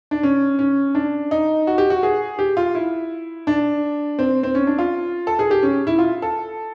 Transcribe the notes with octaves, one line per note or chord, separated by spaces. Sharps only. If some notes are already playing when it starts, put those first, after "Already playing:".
D4
C#4
C#4
D4
D#4
F#4
G4
F#4
G#4
G4
F4
E4
D4
C4
C4
C#4
D4
F4
A4
G#4
G4
C#4
E4
F4
A4